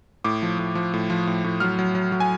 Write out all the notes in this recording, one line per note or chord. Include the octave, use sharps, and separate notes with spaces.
A2 D6
F3
A2
F3
A2
F3
A2
A2
F#3 F6
F#3
F#3
F#3
G#5